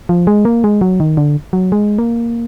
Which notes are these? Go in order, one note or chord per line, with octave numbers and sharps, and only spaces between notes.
F3
G#3
A#3
G#3
F#3
D#3
D3
F#3
G#3
A#3